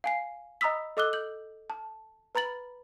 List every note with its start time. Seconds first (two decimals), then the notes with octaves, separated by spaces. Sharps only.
0.04 F5 G#5 C7
0.61 D#5 A#5 B5 D#6 E6 B6
0.97 A4 D#5 D6 E6 F#6 G7
1.13 G6 F#7
1.70 A5
2.35 B4 A#5 B5 A6 F#7